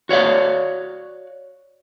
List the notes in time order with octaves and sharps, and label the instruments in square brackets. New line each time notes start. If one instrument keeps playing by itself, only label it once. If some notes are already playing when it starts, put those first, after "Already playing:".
[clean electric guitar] F#4 C#5 D5 F5